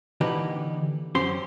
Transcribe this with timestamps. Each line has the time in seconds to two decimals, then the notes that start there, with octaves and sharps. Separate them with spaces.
0.21 D3 E3 A#3 D#4 G4 B4
1.15 F#2 C#4 G4 C5 C6